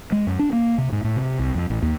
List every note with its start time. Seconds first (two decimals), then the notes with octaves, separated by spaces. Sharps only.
0.12 G#3
0.27 F#2
0.39 D4
0.53 A#3
0.78 C3
0.92 G#2
1.04 A2
1.16 C3
1.39 C2
1.55 F2
1.70 A1
1.82 D#2